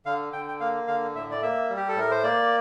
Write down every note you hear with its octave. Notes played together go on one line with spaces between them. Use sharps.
D3 F5
D3 G5
G5
A#3 F5
D3 F5
A2 E5
D5
A#3 E5
G3
G4
A4
A2 A#4
C5
A#3 D5